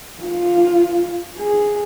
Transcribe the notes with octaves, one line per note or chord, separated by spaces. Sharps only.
F4
G#4